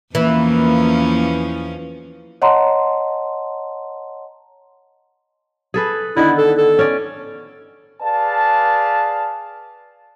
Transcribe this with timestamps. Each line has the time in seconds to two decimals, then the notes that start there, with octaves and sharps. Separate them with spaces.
0.15 E2 E3 F3 A#3 C#4
2.42 C#5 D#5 F#5 A5 A#5 C6
5.74 G#4 A4 B4
6.17 D3 D#3 B3 E4
6.38 A4
6.58 A4
6.79 C#4 D5
8.02 G#4 B4 D5 F5 A5